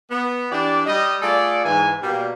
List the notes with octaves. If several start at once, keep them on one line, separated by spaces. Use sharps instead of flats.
B3
E3 D4 G4 D5
G3 D#5
A3 F4 G#4 A4 D5
G#2 E3 G#5
B2 G3 A#3